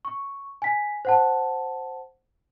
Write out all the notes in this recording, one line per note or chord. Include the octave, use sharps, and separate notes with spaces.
C#6
G#5 B6
C5 F#5 A5